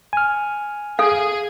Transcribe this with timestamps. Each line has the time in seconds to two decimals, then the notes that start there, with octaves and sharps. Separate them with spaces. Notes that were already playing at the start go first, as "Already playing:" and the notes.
0.13 G#5 F6
0.99 G#4 A4 F5